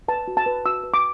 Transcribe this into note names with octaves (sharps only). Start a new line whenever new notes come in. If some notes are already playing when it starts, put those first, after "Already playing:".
B4 A5
F#4
A5
B4
F#4 E6
B4
D6